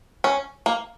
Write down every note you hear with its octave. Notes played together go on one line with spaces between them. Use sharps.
C#4
A#3